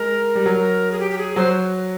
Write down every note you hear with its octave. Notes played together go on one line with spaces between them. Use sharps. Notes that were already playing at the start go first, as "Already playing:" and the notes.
Already playing: G#3 A#4
G3
F#3
G#4
G4
G4
G#4
F#3 C5